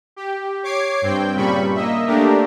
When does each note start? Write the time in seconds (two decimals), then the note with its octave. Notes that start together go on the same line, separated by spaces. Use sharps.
0.16 G4
0.63 C#5 D6 G#6 C7 D7
1.02 G2 C4 G5
1.35 G2 A#2 C#3 G3 B5 C#6
1.74 A#3 D#5 E5
2.07 A3 A#3 D4 G4 A#4